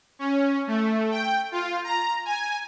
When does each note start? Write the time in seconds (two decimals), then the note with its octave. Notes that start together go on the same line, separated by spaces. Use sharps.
0.19 C#4
0.67 A3
1.11 G5
1.52 F4
1.84 A#5
2.25 G#5